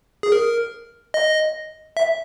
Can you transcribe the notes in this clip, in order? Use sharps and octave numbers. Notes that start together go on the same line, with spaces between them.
G#4
A#4
D#5
E5